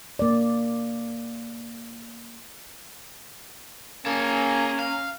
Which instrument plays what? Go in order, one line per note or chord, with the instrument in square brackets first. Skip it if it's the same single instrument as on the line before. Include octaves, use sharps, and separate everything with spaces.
[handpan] A#3 D5
[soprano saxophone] A#3 [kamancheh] C#4 A#5 [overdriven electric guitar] G#4 A5
[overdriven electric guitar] F5